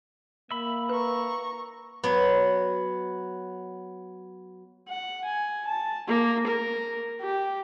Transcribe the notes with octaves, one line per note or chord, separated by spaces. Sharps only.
A#3 E5 B5
B4 A#5 C#6
F#3 B3
F#5
G#5
A5
A#3
A#4
G4